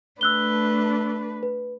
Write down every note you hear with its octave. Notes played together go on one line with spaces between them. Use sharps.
A3 D4 B4 E6 F#6 G7
B4